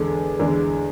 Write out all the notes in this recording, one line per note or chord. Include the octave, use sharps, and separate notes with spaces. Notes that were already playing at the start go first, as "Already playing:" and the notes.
Already playing: E2 D3 G#3 G#4 A4
E2 D3 G#3